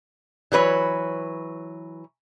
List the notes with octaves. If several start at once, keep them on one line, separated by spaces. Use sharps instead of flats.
E3 F#3 B4 C#5